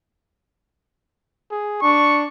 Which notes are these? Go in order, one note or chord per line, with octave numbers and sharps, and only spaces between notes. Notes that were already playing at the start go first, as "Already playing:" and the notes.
G#4
D4 C#6